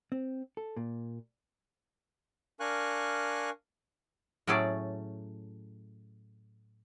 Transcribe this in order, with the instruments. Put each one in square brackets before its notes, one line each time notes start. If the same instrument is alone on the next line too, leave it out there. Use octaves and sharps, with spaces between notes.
[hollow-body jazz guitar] C4
A4
A#2
[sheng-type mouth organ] D4 A#4 F5 G#5 C#6 F#6
[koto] A2 F#3 A3 C#4 G#4 D5